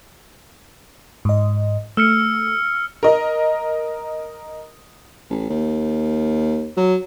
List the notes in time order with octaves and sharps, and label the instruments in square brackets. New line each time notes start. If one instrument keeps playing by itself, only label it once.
[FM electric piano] G#2 D#5
[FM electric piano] A3 [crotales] E6 F6 C#7
[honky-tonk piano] A#4 D#5
[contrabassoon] A1
D#2
F#3